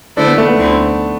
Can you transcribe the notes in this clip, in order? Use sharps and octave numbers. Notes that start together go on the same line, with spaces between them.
D3 A3 D4 E4 A4 C5
B3
A3
B3
D2 D3 A3 C4 E4